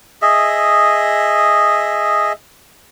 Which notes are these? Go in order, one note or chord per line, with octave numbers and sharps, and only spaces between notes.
G#4 D#5 E5